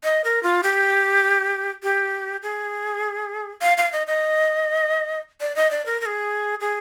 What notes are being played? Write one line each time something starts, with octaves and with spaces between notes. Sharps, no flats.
D#5
A#4
F4
G4
G4
G#4
F5
F5
D#5
D#5
D5
D#5
D5
A#4
A#4
G#4
G#4